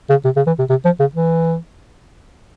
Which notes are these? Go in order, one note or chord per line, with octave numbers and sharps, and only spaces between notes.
C#3
C3
C#3
E3
C3
C3
F3
C#3
E3